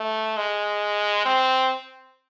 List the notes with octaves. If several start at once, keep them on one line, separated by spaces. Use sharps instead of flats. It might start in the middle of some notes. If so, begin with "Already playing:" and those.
Already playing: A3
G#3
C4